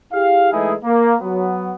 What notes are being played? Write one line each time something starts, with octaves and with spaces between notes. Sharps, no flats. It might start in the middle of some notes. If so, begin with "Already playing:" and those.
E4 G4 G#4 F5
E3 G#3 A3 D#4 E4 G#4
A#3
F#3 B3